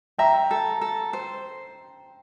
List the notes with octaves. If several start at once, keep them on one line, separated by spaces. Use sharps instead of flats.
E5 G5 A#5
A4
A4
C5